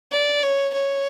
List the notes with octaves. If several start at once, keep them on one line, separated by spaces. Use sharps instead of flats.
D5
C#5
C#5